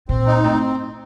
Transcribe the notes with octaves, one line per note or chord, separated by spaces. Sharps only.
A#2 C4
D#4
A2 C4